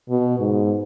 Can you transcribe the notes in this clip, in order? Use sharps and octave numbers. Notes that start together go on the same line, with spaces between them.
B2
G#2